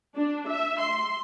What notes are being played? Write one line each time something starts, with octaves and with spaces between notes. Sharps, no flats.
D4
E5
C6